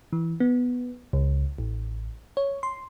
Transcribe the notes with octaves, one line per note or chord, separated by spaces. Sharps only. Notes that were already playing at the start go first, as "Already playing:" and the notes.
E3
B3
C#2
A1
C#5
C6